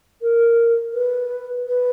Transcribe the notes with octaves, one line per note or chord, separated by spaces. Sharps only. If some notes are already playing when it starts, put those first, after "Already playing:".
A#4
B4
B4